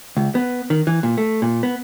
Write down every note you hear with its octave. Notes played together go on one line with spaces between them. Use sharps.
C#2
B3
D#3
E3
A#2
A3
A#2
B3